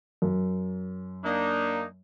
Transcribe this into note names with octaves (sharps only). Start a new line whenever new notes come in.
F#2
A#3 D4 D#4